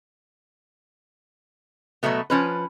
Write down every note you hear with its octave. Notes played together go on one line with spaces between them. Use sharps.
B2 F#3 G#3 A3 B3
F3 C#4 B4